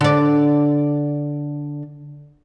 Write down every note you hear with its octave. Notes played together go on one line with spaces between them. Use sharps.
D3 D5